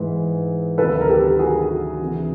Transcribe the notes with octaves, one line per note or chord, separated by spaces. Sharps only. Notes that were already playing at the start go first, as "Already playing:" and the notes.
Already playing: G#2 E3 G#3
D2 C3 D#3 F#3 A4 B4
A#4
G4 A4
F#4 G#4
D2 C3 E3